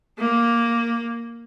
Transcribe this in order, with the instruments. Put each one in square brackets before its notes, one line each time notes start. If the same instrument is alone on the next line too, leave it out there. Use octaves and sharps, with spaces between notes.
[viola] A#3